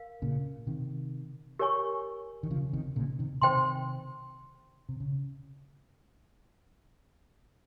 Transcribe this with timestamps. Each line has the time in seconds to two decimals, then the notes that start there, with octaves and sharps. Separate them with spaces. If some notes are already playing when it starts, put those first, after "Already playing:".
Already playing: A#4 F5
0.22 A#2 C#3
0.67 C3 D#3
1.59 G4 A#4 C#5 G#5 C#6
2.43 D#3
2.51 C#3 F3
2.73 C3 D#3
2.96 A#2 C#3
3.19 C3 D#3
3.42 C3 D#3 C5 G5 C6
4.89 C3
5.00 C#3